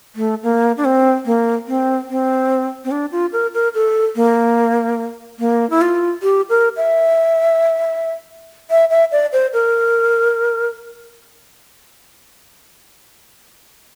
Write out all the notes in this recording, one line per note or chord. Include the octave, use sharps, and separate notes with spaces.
A3
A#3
D4
C4
A#3
C4
C4
C4
D4
F4
A#4
A#4
A4
A#3
A#3
E4
F4
G4
A#4
E5
E5
E5
D5
C5
A#4